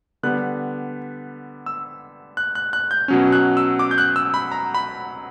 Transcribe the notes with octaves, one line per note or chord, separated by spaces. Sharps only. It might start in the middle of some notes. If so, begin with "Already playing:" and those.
D3 G3 B3 F#6
E6
F#6
F#6
F#6
G6
B2 F#3 C#4
F#6
E6
D6
G6
F#6
E6
B5
A#5
B5